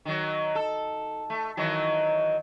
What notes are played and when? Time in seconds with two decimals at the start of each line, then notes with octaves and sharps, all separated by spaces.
0.05 D#3 F#3
0.55 A4
1.30 A3
1.57 D#3 E3 F#3